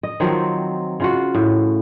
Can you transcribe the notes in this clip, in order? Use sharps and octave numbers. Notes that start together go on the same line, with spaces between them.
D#5
D#3 F3 F#3 C4
C#3 F4 F#4
A2